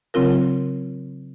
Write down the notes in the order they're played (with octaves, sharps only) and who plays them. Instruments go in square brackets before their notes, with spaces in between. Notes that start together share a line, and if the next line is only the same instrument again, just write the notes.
[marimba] C#3 F#3 C4 F4 A#4